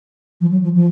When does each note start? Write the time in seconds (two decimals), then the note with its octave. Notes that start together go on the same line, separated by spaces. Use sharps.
0.40 F3
0.51 F#3
0.63 F3
0.74 F3